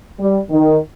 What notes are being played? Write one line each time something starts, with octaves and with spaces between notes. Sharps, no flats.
G3
D#3